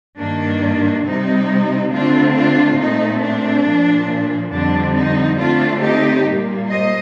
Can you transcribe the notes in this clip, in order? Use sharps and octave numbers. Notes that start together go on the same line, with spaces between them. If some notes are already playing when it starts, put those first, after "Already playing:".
G2 D#3 A#3 D4
C3 G3 C4 D#4
D3 A3 C4 D4 F4
D4 F4
A#2 A3 C4 D#4
D4
A#2 F3 A#3
F2 D3 G3 C4 D4
D#4
D3 A3 C4 D4 F4
D#4 G4
A#2 G3 A#3
C5 D#5